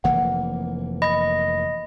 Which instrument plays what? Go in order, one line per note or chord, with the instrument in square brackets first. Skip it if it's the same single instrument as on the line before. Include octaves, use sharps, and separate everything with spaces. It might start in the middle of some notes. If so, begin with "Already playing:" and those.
[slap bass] F1 E3 A#3 [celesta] F#5
[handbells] D#5 [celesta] B5 A#6